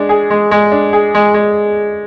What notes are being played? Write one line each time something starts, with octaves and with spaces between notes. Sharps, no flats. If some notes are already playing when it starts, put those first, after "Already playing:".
Already playing: G#3 D4
G#4
G#3
G#3
D4
G#4
G#3
G#3